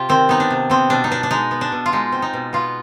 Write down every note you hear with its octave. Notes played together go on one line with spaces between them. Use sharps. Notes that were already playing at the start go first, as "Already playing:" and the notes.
Already playing: C3 F4 G4
D#3 C4
B3 D#4
D4
C3
B3 C4
B2 D4
D#4
B3 D4
D4
G#3 D#4
B3
D4
B2
F4
G#3 D#4
C4
D#4
B2
B3 F4